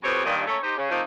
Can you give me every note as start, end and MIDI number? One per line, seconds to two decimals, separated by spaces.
0.03 0.24 41
0.03 0.24 47
0.03 0.24 59
0.03 0.24 60
0.03 0.24 67
0.03 0.24 73
0.24 0.42 43
0.24 0.42 46
0.24 0.42 51
0.47 0.57 57
0.47 0.57 58
0.47 0.57 61
0.47 0.57 69
0.47 0.57 73
0.62 0.73 63
0.62 0.73 67
0.62 0.73 72
0.77 0.90 49
0.90 1.02 53
0.90 1.02 57
0.90 1.02 58
0.90 1.02 60
0.90 1.02 63